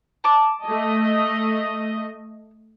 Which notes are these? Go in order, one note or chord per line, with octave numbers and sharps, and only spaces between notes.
A5 D6
A3 D#5